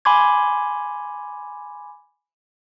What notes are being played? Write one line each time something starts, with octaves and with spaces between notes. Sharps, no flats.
G#5 B5 C6 D6 G#6